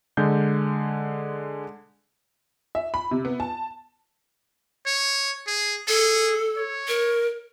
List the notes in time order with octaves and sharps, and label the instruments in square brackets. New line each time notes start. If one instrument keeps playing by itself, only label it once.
[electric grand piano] D3 G#3 G6
[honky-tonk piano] E5
B5
C3
B3
A5
[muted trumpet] C#5
G#4
[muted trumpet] G#4 [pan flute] A4
[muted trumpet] C#5
[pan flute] A#4